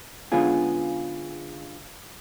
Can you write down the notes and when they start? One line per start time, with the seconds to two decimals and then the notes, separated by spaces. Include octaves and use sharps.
0.32 D3 G#3 B3 C#4 F4 G#4